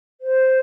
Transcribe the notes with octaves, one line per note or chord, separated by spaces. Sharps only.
C5